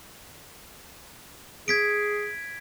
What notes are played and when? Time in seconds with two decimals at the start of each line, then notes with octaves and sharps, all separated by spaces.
1.68 G#4 G#6 B6 D7